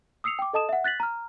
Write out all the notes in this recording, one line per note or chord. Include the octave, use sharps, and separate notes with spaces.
D#6 E6 C7 C#7 F7
G5 D6
A4 D#5 A5 D#6 E7
E5 F#5
F#6 A6 B6 F#7
A#5 F6